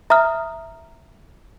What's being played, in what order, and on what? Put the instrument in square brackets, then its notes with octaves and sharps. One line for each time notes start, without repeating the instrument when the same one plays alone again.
[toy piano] E5 [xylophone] A#5 D#6 F6